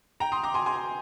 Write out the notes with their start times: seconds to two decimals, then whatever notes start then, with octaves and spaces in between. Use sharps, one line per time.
0.20 G5 A#5
0.32 C6 D#6
0.43 A#5 D6
0.54 G#5 C6
0.66 G#5 C6